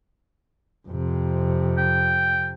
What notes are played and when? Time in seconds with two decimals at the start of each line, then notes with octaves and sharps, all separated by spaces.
0.88 F2 C3
1.78 G5